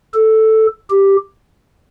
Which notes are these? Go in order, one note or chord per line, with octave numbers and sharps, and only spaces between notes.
A4
G4